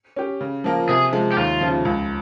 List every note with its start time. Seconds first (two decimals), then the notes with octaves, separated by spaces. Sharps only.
0.16 C#4 G4
0.41 C#3
0.64 F3 A#3 F4 A#4
0.89 C3 G#4
1.12 F3 G#3
1.32 G4
1.37 D#2 F4
1.61 C#3 F3
1.85 C#2